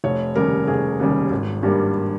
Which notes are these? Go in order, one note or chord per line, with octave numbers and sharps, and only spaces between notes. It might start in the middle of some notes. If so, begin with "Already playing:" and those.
F1 C#5
D#2 C#3 G3 A#4
F1 G#4
D#2 C#3 G3
G#1
G2 G3 A#3